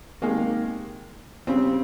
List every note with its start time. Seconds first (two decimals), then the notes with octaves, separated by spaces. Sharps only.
0.22 C3 D#3 G#3 A#3
1.47 C#3 G3 C4